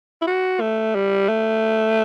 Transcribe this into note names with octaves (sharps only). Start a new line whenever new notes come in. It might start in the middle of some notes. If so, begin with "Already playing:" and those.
E4
F#4
A3
G3
A3